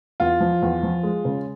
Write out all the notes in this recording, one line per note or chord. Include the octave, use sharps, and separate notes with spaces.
E2 F4
F3
E2
F3
G#3
C#3